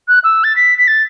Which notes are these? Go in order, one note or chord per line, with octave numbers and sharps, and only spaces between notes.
F#6
E6
A6
B6
B6
A6